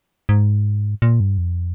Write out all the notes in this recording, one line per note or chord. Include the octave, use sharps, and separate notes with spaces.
G#2
A#2
G2
F2